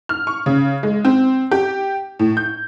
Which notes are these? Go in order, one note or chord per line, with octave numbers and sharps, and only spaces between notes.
F6
C#6
C#3
G#3
C4
G4
A2
G6